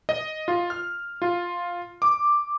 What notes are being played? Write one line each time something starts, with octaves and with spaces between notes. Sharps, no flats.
D#5
F4
F6
F4
D6